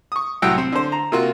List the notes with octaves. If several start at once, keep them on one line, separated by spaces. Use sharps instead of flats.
C#6 D#6
C2 A2 F#3 F#5 G5 E6
C4
D3 C5
A#5
C3 A#3 F4 F#4